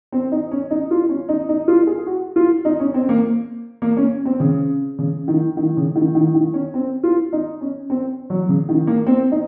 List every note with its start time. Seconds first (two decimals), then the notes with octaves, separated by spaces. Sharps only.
0.12 C4
0.32 D#4
0.51 C#4
0.71 D#4
0.91 F4
1.09 C#4
1.29 D#4
1.49 D#4
1.68 F4
1.87 G#4
2.07 F#4
2.36 F4
2.65 D#4
2.80 C#4
2.94 C4
3.09 A#3
3.82 A#3
3.97 C#4
4.25 C4
4.40 C#3
4.99 C#3
5.28 D#3
5.57 D#3
5.77 C#3
5.96 D#3
6.15 D#3
6.35 D#3
6.54 C#4
6.74 C4
7.03 F4
7.33 D#4
7.61 C#4
7.90 C4
8.30 F#3
8.49 C#3
8.69 D#3
8.87 A#3
9.07 C4
9.32 D#4